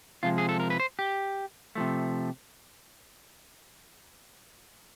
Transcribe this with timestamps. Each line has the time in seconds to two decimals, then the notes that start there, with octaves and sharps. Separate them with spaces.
0.23 C3 F3 G#3 F4
0.38 G#4
0.49 A4
0.60 A#4
0.70 B4
0.80 C5
0.99 G4
1.75 C3 F3 A3